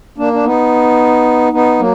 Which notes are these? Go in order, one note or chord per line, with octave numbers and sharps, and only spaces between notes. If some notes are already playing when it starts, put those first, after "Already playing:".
A#3 D4
D4
B3 D#4
B3 D#4
F#3 A#3